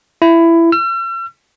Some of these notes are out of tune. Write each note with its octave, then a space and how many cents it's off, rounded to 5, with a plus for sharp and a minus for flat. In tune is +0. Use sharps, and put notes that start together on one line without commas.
E4 +15
E6 +45